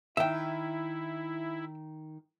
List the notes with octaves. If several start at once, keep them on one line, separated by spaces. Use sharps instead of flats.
D#3 E4 E5 G5